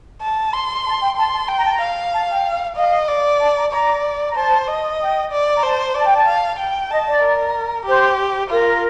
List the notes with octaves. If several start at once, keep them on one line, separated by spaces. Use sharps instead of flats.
A5
C6
A5
G5
A5 C6
A5
G5
A#5
A5
A#5
F5
A5
G5
D#5 F5
D5
A5
A#5
D5 A#5
A#5
C5 A5
D#5
G5
D5
A#5
C5 A5
D5 A5
G5
A5
F5
G5
D#5 A5
D5
A#4
G4 C5
F4 A#4